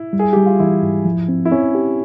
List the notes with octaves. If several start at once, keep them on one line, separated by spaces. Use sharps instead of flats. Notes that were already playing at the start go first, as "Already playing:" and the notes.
Already playing: E4
G3
G#4
G3 G4
F4
E3 E4
G#2
F3
C4
E4
C4 C#4
G4